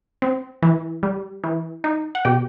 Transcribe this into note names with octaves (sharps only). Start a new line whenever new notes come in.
C4
E3
G3
E3
D#4
F#5
B2 G4 G5